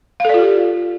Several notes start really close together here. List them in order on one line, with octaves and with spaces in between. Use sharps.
F5 A4 D5 F4 G4